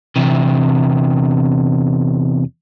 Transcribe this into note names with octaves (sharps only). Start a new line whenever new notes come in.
E2 C3